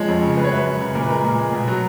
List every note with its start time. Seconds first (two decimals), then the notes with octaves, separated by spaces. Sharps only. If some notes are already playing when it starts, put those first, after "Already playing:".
Already playing: F3 G#3 C#5
0.08 F2
0.22 C#3
0.37 G#3 B4
0.44 C#5
0.51 F#2 B4
0.66 F#2
0.80 C#3
0.95 A#2 A#4
1.02 B4
1.10 G#3 A#4
1.24 A#2
1.39 G#3
1.53 B2
1.68 F#3